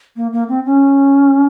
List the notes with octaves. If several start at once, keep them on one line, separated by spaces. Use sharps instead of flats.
A#3
A#3
C4
C#4